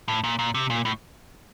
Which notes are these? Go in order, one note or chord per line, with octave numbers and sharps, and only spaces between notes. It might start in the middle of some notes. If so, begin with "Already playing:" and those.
A2
A#2
A#2
C3
A#2
A2